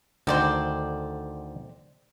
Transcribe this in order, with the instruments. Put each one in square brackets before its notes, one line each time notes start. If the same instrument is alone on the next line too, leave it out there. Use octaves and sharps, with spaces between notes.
[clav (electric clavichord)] D2 D3 D#3 [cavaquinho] C5 D5 G5